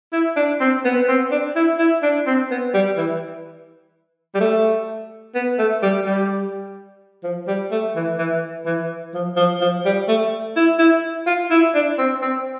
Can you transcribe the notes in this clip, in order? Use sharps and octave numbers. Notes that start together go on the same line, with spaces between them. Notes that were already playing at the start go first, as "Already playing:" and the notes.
E4
D4
C4
B3
B3
C4
D4
E4
E4
D4
C4
B3
G3
E3
G3
A3
B3
A3
G3
G3
F3
G3
A3
E3
E3
E3
F3
F3
F3
G3
A3
E4
E4
F4
E4
D4
C4
C4